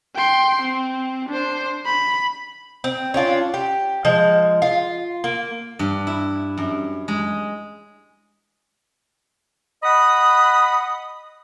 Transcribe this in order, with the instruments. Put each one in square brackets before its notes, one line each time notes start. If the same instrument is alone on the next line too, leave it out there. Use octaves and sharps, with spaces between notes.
[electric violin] G5 C6
C4
D4 C5
B5
[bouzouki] C4
C#4 D4 F4
G4
F3 G#3
F4
A#3
[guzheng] G2
E4
F#2
G#3
[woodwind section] D#5 F#5 B5 D#6